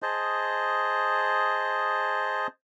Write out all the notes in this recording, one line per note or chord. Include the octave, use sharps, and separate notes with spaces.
G#4 C5 D#5 A5